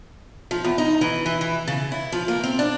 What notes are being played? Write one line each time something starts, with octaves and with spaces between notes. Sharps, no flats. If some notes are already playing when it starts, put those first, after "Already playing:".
F3
E2
D#4
E3
E3
E3
C#3
E4
F3
A#3
C4
D4